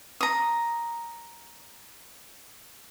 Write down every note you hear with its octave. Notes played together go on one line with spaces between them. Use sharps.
A#5 D#6